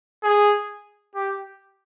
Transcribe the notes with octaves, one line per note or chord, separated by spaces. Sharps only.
G#4
G4